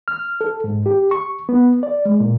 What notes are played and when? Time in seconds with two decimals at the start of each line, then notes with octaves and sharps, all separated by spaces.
0.08 F6
0.41 A4
0.64 G#2
0.86 G4
1.11 C#6
1.49 B3
1.83 D5
2.05 G#3
2.20 A#2